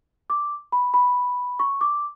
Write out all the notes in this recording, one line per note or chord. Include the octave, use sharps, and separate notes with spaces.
D6
B5
B5
C#6
D6